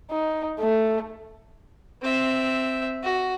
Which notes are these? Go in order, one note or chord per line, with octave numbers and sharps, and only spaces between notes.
D#4
A3
C4 E5
F#4